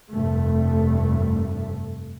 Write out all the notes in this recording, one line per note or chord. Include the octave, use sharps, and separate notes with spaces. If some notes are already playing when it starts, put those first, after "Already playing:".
F1 G2 A3